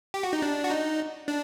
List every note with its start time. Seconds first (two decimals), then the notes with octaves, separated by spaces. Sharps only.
0.14 G4
0.23 F#4
0.33 D#4
0.42 D4
0.64 F#4
0.70 D#4
1.28 D4